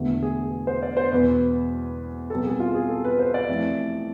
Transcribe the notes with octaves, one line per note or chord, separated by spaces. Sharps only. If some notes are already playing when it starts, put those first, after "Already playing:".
Already playing: E1 E2 D3 A3
G#4
C5
D5
C5
E1 E2 B2 B3 B4
C2 B2 B3 A4
G#4
F4
G#4
A4
B4
C5
D5
F2 E3 A3